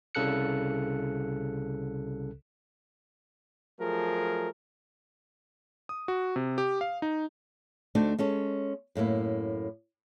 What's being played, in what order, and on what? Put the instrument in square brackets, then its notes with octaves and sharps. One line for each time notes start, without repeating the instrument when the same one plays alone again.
[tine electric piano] C2 C#3 A4 F#6 C#7
[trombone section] F3 F#3 A3 G#4 A#4
[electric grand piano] D#6
F#4
C3
G4
F5
D#4
[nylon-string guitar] D2 A3 D4 D#4 F#4 C5
G#3 C#4 A4 C#5
F#2 A2 A#3 E4